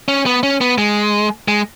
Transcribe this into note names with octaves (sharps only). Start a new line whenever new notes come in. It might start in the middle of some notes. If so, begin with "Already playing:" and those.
C#4
B3
C#4
B3
G#3
G#3